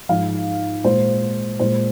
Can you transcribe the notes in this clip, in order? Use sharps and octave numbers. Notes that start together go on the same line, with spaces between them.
G#2 F3 G#3 F5
A#2 G#3 C5
A#2 G#3 C5